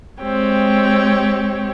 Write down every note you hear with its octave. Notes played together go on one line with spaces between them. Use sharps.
G#3 C4 G4 C#5